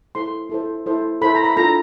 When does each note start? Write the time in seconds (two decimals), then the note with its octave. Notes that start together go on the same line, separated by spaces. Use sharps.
0.15 E4 A4 C5 C6
0.50 E4 A4 C5
0.86 E4 A4 C5
1.21 E4 A4 C5 B5
1.35 A#5
1.44 B5
1.57 D4 F4 A4 A#5